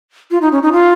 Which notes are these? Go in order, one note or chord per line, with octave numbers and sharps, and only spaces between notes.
F4
D#4
C#4
D#4
F4